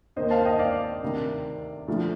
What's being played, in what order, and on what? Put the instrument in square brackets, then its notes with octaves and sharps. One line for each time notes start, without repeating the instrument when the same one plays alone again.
[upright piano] D#2 D#3 A#3 C5 D#5
F5 A5
D#5 G5
D5 F5
D2 C3 D#3
D2 D3 F3 A3